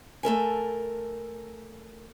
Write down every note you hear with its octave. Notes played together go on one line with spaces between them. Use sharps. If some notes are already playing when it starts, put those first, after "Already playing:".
A3 A4 A#4 G#5